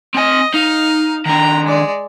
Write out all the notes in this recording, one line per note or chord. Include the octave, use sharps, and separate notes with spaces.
C4 D#5 G#5
D#4 F5
D#3 D4 G5 A#5
G#3 D5